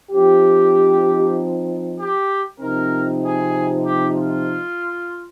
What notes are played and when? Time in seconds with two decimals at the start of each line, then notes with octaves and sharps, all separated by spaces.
0.11 F3 C4 D#4 G4
1.99 G4
2.60 C3 F3 C4 D#4 A#4
3.22 G#4
3.84 G4
4.15 F4